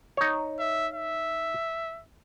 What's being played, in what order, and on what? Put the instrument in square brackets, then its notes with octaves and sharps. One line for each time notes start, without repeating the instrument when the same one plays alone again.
[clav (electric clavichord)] D#4 C#5
[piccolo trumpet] E5
E5